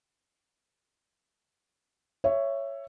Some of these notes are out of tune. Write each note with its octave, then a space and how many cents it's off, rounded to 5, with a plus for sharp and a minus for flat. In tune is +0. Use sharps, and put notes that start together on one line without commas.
C#5 +0 E5 +15